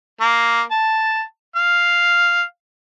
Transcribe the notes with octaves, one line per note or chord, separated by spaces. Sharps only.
A#3
A5
F5